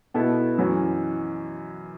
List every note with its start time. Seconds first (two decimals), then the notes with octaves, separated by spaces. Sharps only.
0.14 B2 B3 E4 A4
0.58 F#2 E3 C#4 F#4